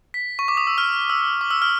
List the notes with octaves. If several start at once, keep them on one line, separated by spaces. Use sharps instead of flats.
B6
C#6
D6
D#6
E6
F6
E6
D6
E6
F6